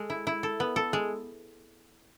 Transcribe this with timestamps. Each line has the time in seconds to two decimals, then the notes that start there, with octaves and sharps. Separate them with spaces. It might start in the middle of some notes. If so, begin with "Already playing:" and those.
Already playing: G#3 A4
0.10 E4
0.27 E4
0.43 A4
0.60 B3
0.76 A4
0.93 G#3